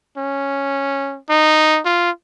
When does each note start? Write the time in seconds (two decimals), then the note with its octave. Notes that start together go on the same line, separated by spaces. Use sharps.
0.17 C#4
1.29 D#4
1.85 F4